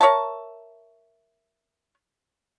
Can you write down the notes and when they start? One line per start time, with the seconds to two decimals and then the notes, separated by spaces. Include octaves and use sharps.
0.01 A#4 C#5 E5 A5